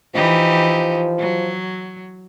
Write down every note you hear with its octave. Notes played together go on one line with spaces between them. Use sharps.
E3 F3 D#4 G4
F#3